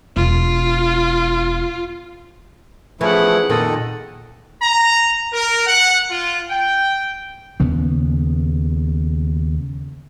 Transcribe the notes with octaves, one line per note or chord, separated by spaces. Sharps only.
E1 F4
E3 F3 A3 C#4 E4 G#4 F#5
F2 A#2 D#3 A4 D#5
A#5
A#4
F#5
F4
G5
D#2 C#3 B3